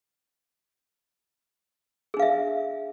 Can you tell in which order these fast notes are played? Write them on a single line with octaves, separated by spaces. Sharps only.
G#4 D4 F5 E5